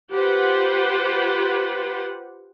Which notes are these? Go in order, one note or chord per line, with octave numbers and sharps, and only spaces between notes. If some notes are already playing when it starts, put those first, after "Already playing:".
F4 G4 B4 C5 F#5